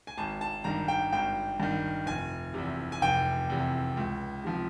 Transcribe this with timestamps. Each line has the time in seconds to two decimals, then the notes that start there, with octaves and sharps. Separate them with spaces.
0.07 G#5
0.17 G#1 A5
0.41 A5
0.64 G2 D#3 A#5
0.88 G5
1.13 G#1 G5
1.60 G2 D#3
2.07 F1 G#5
2.54 E2 C3
2.92 G#5
3.02 F1 G5
3.50 E2 C3
3.97 C#2
4.44 C3 F3